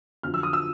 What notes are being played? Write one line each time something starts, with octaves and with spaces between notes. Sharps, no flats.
F2 D3 F#3 F6
E6
D#6
E6